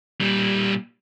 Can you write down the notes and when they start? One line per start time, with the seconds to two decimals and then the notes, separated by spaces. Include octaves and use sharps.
0.21 A#2 G3